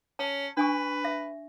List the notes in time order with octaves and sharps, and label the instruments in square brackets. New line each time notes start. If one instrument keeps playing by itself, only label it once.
[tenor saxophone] C#4 [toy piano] A5
[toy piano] D4 G#5 C#6 [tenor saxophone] B4
[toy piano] E5